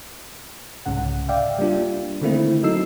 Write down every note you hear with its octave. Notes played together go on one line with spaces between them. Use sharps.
C2 G#2 C#3 F#5
D5 E5 F5 G5
G3 A#3 D4 F4
D3 D#3 A3 A#3 C4 E4
F#3 D#4 A4 E6 C7